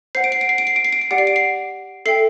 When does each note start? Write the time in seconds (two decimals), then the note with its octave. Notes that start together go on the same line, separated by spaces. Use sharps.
0.15 C5 F#5 C7
0.24 D7
0.32 C7
0.41 D7
0.49 C7
0.58 D7
0.67 C7
0.76 D7
0.85 C7
0.93 D7
1.01 C7
1.11 G4 D5 F#5 D7
1.18 C7
1.27 D7
1.36 C7
2.06 A4 E5 G5 C7